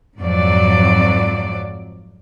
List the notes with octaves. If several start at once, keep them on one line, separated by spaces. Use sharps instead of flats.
F2 G#2 F#3 D5